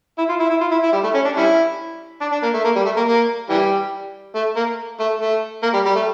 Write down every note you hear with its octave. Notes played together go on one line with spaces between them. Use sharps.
E4
F4
E4
E4
F4
E4
E4
G3
A3
C#4
D4
G3 C#4 E4
D4
D4
A#3
A3
A#3
G3
A3
A#3
A#3
E3 G3
A3
A#3
A3
A3
A#3
G3
G3
A3